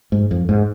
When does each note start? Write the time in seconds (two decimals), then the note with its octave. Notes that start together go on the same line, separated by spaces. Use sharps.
0.12 G#2
0.31 F2
0.49 G#2